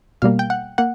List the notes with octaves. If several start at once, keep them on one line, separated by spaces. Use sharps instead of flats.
B2 G3 A#3 F5
G5
F#5
A#3 F#5